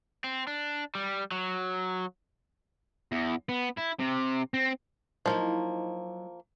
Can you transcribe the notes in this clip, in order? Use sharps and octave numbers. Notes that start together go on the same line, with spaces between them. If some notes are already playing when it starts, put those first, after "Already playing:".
C4
D4
G3
F#3
E2
B3
E4
C3
C4
F3 F#3 A#3 D#4 E4